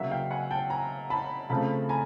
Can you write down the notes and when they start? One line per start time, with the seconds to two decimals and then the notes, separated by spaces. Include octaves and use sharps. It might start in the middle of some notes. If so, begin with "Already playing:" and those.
Already playing: C#3 F#3 A#3 E5 F#5
0.11 F5 G5
0.31 F#5 G#5
0.51 G5 A5
0.70 G#5 A#5
1.10 A5 B5
1.49 C#3 F3 A3 C4 A5 B5
1.89 G#5 A#5